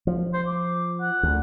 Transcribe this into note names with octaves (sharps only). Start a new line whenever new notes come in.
F3
C5
D6
F#5
D2